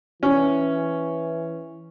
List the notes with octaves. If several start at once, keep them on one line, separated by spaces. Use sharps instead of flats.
E3 C#4